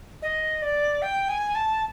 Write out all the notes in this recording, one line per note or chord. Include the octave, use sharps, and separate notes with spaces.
D#5
D5
G5
G#5
A5